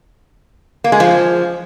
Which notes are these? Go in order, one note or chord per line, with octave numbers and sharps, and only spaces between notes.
A#3
G#3
F3